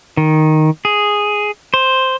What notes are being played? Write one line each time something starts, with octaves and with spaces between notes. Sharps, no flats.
D#3
G#4
C5